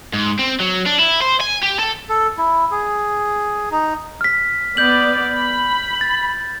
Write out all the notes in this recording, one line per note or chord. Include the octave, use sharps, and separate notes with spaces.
G#2
C4
F#3
D4
E4
C5
G#5
G4
A4
A4
E4
G#4
D#4
F6 B6
B3 D5 G6 F#7
B5
A6